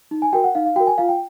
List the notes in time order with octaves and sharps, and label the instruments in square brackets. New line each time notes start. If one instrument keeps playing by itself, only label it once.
[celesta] D#4
G#5
F#4 A#4 G5
F#5
D#4 F5
F5
F#4 G5
A#4
G#5
F4 F5
G5